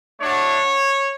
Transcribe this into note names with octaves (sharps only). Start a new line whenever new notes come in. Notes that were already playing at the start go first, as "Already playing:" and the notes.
A3 D4 F#4 C#5